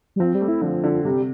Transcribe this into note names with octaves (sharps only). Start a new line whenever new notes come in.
G3
F3 C4
G3
A3
E4
D3 F3
D3
C3 G3